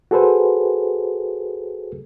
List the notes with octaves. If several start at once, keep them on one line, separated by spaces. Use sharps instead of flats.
F#4 G#4 A4 B4 C5